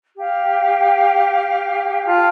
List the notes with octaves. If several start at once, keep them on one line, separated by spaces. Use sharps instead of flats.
G4 F5
F4 F5 G5 A5